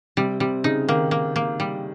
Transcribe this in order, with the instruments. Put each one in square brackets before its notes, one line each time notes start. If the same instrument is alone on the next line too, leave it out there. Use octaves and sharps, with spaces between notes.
[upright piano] C3 [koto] G3
[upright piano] C3 [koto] G3
[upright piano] C#3 [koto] D#4
[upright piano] D#3 [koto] A#3
[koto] A#3
A#3
G3